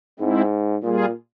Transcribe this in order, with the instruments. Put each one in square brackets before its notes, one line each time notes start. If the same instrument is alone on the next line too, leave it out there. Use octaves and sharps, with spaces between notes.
[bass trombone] G#2 [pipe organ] G#3 C4 E4
[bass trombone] A#2 [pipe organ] G3 A#3 F4 G#4